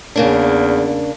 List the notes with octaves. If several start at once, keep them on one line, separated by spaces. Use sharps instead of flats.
E2 C#3 A#3 D4